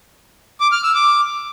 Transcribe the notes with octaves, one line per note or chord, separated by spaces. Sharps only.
D6
F6
E6
D6